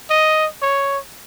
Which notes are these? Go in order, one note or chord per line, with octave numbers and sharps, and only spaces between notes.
D#5
C#5